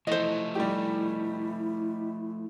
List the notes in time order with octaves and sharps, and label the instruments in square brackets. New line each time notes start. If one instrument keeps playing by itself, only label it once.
[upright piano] E3 [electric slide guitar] F3 A3 [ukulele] C5 D#5
[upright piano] G3 D#4 G4 [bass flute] E4